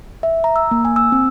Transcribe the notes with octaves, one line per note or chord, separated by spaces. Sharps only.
E5
A#5
E6
A#3
G#5
E6
C4